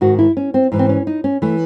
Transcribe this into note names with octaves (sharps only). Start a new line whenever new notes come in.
G#2 D#3 F#4
E4
C#4
C4
G#2 E3
C4
C#4
D#4
C#4
E3 A3